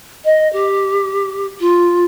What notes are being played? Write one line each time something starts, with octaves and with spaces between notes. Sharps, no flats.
D#5
G4
F4